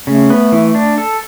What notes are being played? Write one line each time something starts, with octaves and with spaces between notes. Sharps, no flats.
C#3 A3
B3
E3
D4
A4